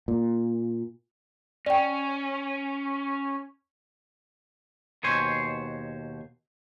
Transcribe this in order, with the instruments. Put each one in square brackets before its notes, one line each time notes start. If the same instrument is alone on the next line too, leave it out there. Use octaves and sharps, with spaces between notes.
[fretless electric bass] A#2
[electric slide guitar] C#4 [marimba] D5 G5
[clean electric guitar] D#2 B2 C5 C#5 G#5